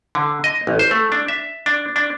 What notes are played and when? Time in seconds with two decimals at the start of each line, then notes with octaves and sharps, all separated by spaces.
0.15 D3
0.44 D#5
0.67 A1
0.79 C5
0.91 A3
1.12 D4
1.28 E5
1.66 D4
1.96 D4